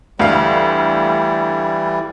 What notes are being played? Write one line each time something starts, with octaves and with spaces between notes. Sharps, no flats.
D2 E3 G3 F5